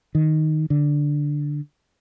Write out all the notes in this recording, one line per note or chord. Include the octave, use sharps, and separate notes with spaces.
D#3
D3